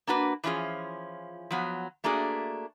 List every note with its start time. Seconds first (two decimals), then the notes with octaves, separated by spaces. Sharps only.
0.07 A#3 D4 F#4 B4
0.44 E3 F3 C#4 F4 G#4
1.51 F3 F#3 B3
2.04 A3 A#3 D4 F#4 G#4